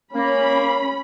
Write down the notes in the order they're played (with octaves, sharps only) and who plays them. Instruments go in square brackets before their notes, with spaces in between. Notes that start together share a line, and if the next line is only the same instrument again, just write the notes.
[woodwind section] A#3 [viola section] C#4 B5